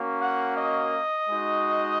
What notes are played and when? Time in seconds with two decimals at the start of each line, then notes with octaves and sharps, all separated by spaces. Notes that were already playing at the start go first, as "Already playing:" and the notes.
Already playing: A#3 C#4 F#4
0.21 F#5
0.58 D#5
1.30 G#3 D#4 F#4